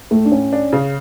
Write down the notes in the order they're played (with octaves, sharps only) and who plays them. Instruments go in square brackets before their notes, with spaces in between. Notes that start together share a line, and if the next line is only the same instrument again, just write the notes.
[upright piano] A2 [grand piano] A3
[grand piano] D4
[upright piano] A2 [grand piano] C#4
[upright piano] D4
C#3